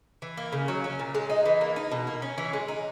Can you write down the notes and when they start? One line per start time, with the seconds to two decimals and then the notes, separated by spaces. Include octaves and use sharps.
0.22 E3
0.37 A#3
0.53 C#3
0.68 F#3
0.84 C#4
0.99 A#2
1.15 G#3
1.30 D#4
1.46 E3
1.61 A#3
1.76 D#4
1.92 B2
2.07 A#3
2.22 C#4
2.38 E3
2.53 G#3
2.68 D#4